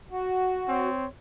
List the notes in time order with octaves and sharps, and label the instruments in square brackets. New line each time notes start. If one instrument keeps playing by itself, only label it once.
[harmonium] F#4
[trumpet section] C4 C#5